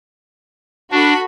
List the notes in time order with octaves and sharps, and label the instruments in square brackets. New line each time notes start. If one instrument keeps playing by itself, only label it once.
[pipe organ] D4 [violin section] F#4 A4 B5